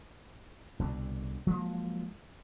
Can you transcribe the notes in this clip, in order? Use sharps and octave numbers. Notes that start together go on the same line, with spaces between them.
C2 B2 D3
F3 F#3 G#3 A#3